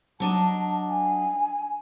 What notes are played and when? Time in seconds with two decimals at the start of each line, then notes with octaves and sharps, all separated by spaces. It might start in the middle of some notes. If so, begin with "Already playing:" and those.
0.20 F#3 D4 D#5 A5
0.89 G#5